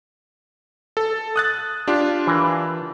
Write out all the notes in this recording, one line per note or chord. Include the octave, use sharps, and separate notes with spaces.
A4
D#6 F#6 A6
D4 F4 G4
E3 A#4